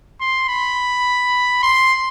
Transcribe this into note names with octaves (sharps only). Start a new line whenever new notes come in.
C6
B5
C6